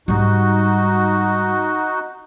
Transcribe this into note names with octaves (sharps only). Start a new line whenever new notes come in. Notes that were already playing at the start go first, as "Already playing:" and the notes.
G#2 G3 D#4 F#4